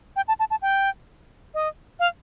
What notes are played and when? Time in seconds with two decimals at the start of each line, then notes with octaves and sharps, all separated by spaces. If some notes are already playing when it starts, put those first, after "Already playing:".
0.16 G5
0.28 A5
0.40 A5
0.51 A5
0.62 G5
1.54 D#5
2.00 F5